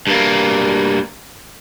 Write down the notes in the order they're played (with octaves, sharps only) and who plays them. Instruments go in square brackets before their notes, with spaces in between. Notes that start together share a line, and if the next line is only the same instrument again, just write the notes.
[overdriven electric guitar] G2 A#3